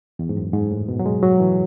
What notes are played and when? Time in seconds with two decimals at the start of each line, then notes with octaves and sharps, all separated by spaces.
0.19 E2
0.29 G#2
0.37 F#2
0.54 G#2
0.71 A2
0.88 B2
0.99 F#3
1.06 G#3
1.23 F#3
1.40 E3